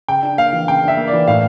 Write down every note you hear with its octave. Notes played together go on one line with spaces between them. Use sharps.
C#3 G5
D4
A#3 F5
E3
C#3 G5
D4 E5
A#3
D5
E3
A2 F5